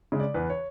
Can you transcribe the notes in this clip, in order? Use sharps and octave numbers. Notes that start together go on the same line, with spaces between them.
C#3 G#3
D5
E2 B4
C#5